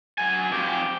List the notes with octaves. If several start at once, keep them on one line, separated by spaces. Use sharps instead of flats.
F#3 G#5
F2 G4